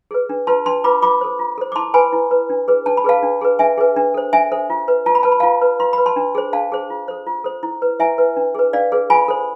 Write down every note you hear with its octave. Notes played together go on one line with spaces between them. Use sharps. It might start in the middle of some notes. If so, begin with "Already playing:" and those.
G#4 B4
D4
F4 B4 A5 C6
D4 A5 C6
F4 B4 B5 D6
F4 B5 D6
A4 C5
F4
A4 C5
D6
E4 A5 C6
B4 G#5 B5
E4
B4
D4
G#4 B4
D4 A5
B5
G#4 B4 F5 A5
D4
G#4 B4
D4 E5 G#5
G#4 B4
D4
A4 C5
D4 E5 G#5
A4 C5
F4
B4
F4 A5
B5
B4 A5
B5
F4 F5 A5
B4
F4 C6
B5
B4
A5 C6
D4
G#4 C5
D4 F5 A5
G#4 C5
F4
A4 C5
F4
A4 C5
E4
B4
E4 E5 G#5
B4
D4
G#4 B4
D4 D5 F5
G#4 B4
F4 G#5 B5
A4 C5